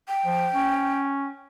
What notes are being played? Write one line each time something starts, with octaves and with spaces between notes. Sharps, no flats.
G5
F3
C#4